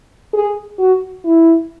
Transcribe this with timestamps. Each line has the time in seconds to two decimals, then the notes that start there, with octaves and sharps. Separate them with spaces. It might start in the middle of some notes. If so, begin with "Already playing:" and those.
0.34 G#4
0.79 F#4
1.25 E4